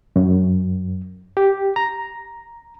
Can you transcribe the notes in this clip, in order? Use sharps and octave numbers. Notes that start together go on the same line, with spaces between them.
F#2
G4
A#5